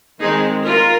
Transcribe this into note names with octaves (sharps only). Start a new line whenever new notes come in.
D#3 G#3 C4 D#4 G#4
F4 A#4